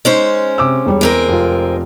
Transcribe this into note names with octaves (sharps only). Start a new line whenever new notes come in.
G#3 C#4 D#4 C5
C3 D6 E6
E1 G3 C#5
E2 G#3 C4 A#4
F1 F4